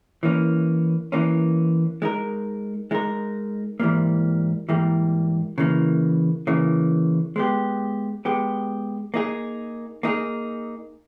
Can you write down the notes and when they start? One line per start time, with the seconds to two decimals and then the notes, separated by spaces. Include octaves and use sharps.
0.23 E3 A#3 C#4
1.12 E3 A#3 C#4
2.02 G#3 D#4 A#4
2.91 G#3 D#4 A#4
3.80 G#2 E3 G3 A#3
4.69 G#2 E3 G3 A#3
5.58 C#3 E3 A#3
6.47 C#3 E3 A#3
7.36 G#3 B3 G4
8.25 G#3 B3 G4
9.14 A#3 D#4 G#4
10.03 A#3 D#4 G#4